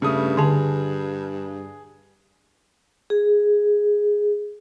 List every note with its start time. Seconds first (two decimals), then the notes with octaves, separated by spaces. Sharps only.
0.02 G2 C#3 A3 D#6
0.37 D3 G#4 A5
3.10 G#4